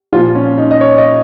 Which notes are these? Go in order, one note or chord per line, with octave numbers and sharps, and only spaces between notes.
A#2 F3 F4
C#4
D#4
D#5
C#5
D#5